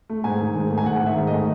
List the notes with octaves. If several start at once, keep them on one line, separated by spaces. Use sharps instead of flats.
A3
G#2 G#5
D#3
G#2
A3
G#5
G#2 F#5
D#3 E5
G#2
A3 D#5